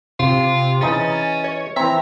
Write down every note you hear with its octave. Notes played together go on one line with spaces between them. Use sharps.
C3 F4
E3 C#4 D#4 G#4 A6
C#5
E3 C4 E5 A#5